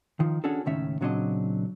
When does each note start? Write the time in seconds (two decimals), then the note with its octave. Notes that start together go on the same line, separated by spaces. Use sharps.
0.20 D#3 F3
0.44 C#4 D4 F#4 G#4 A4
0.66 C#2 A2 D#3 C#4 E5
1.01 A#2 C#3 F#3 C4 D4 D#5